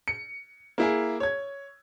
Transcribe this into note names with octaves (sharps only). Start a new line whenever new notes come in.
C#7
A#3 E4 G#4
C#5 G#6